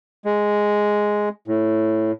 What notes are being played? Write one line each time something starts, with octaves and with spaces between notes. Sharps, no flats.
G#3
A2